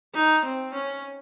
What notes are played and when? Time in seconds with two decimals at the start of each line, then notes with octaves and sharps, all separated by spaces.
0.14 D#4
0.44 C4
0.73 C#4